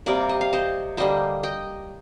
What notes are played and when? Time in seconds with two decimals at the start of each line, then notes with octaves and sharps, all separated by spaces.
0.06 C3 G3 A#3 A#4 D5
0.29 D#5
0.41 F5
0.53 C5 D#5
0.97 D3 G3 A#3 C5 D#5
1.43 D#5 G5